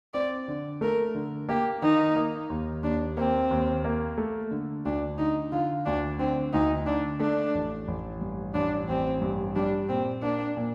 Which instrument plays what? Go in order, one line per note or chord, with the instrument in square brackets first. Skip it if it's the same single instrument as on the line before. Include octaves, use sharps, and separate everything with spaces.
[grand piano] C4 [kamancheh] D5
[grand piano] D3
[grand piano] A3 [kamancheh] A#4
[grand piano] D3
[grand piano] A#3 [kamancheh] G4
[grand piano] D#3 [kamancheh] D#4
[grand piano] A#3
D#2
[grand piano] D#2 [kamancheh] D4
[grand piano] A#3 [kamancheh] C4
[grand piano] D#2
A#3
A3
D3
[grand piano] D2 [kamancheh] D4
[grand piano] D3 [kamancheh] D#4
[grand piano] D3 [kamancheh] F4
[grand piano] D2 [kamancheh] D4
[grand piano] D3 [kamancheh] C4
[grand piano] D2 [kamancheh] D#4
[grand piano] D3 [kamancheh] D4
[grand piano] A3 [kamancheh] D4
[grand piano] A1
A1
G2
[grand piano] A1 [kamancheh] D4
[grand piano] A1 [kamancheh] C4
[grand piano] G2
[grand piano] G3 [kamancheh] D4
[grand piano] A#2 [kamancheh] C4
[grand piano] A#3 [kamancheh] D4
[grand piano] A#2